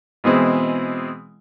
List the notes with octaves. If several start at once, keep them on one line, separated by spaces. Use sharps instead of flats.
B2 E3 G#3 C4 E4